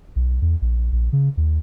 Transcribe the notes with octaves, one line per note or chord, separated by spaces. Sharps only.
B1
E2
A#1
A#1
C#3
D#2